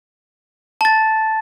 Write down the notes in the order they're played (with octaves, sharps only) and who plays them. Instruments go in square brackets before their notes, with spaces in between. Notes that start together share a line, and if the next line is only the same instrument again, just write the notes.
[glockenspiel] A5 A6